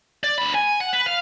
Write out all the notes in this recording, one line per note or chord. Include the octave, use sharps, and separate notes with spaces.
D5
D2 B5
G#5
F#5
B4
F5